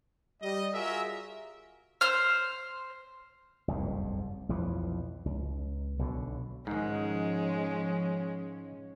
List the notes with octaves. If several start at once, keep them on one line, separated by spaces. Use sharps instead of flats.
G3 D#5
F4 F#4 G#4 A#4 E5
C5 F6
F#1 C2 F2 G#2
B1 F2 E3 F3
C#2
B1 B2 D3
G#2 D#3 F3 G#3 C#4